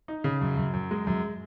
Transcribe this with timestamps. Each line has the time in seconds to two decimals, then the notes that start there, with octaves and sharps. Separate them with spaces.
0.08 D#4
0.24 C#3
0.41 F#2
0.57 F#2
0.73 F#2
0.91 G#3
1.07 F#2